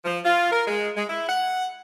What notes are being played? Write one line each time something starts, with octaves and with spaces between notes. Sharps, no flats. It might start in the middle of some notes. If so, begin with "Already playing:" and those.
F3
F4
A#4
G#3
G#3
E4
F#5